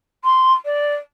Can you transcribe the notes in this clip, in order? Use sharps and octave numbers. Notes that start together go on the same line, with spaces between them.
C6
D5